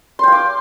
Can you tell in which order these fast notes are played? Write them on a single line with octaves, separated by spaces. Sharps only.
C6 G5 F5 D6